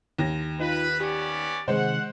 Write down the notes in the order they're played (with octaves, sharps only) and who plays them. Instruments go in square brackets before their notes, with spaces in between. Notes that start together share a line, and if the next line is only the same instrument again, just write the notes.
[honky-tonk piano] D#2 A#6
[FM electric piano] D#4 F4 [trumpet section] B4
[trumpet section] B3 C#4 D5 [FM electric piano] G4
[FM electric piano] C3 D#3 [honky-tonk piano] G#3 C5 [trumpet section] F#5